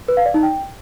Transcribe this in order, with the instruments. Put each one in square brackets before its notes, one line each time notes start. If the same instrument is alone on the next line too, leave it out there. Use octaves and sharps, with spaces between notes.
[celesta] B4
F5
D5
D#4
G5